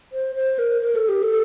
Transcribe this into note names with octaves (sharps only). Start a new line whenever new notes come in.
C5
C5
A#4
A#4
A4
G4
A4